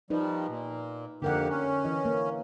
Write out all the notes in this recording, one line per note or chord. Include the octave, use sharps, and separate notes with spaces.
D#3 F3 G3 D#4 B4
A#2
F2 D3 A#3 G4 A#4 F#5
C#4
E3 D#5
A#3